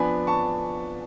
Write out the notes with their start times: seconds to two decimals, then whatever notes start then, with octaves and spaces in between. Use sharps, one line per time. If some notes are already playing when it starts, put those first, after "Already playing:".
Already playing: F3 B3 D4 G#5 B5
0.27 A5 C#6